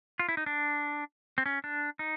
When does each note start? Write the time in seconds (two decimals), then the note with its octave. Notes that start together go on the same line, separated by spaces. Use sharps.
0.19 F4
0.29 E4
0.37 D#4
0.46 D4
1.38 C4
1.46 C#4
1.64 D4
1.99 D#4